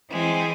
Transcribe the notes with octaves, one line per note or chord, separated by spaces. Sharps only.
E3 G#3 C4